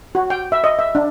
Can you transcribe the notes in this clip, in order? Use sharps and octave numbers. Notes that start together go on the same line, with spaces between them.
F#4
G5
E5
D#5
E5
D4